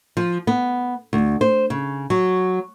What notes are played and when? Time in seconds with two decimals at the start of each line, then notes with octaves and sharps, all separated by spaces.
0.17 F3
0.47 B3
1.13 D2
1.41 C5
1.70 C#3
2.10 F#3